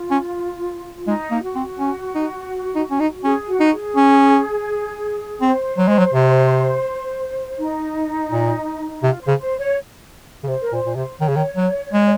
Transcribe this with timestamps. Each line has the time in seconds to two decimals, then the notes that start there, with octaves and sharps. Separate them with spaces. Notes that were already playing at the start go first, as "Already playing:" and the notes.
Already playing: F4
0.10 C#4
1.07 G#3 D#4
1.31 A#3
1.43 F#4
1.55 C4
1.79 C#4
2.15 D#4
2.75 D#4
2.90 C#4
3.00 D#4
3.24 C#4 G#4
3.48 F#4
3.60 D#4
3.72 G#4
3.96 C#4
5.41 C4 C5
5.77 F#3
5.88 G#3
5.98 F#3
6.13 C3
7.58 D#4
8.31 A#2
9.03 C3 F4
9.21 C5
9.27 C#3
9.39 C5
9.58 C#5
10.43 C#3
10.48 C3 C5
10.61 A#4
10.72 A#2 C5
10.85 A#2
10.96 C3 C5
11.20 D#3 C#5
11.28 C#3
11.36 D#3
11.56 F#3
11.93 G#3